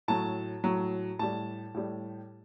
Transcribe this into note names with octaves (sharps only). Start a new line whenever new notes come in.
A2 F#3 A5
A2 F#3
A2 G3 A5
A2 G3